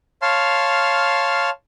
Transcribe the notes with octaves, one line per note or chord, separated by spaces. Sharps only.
C#5 F5 A5 C6 F6